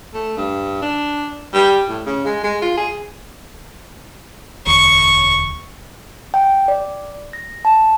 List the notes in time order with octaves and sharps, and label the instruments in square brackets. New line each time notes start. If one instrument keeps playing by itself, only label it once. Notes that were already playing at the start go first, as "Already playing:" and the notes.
[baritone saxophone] A3
G2
D4
G3
A2
C#3
G#3
G#3
F4
G#4
[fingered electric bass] E1 D2 [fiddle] C#6
[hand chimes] G5
D5
A#6
A5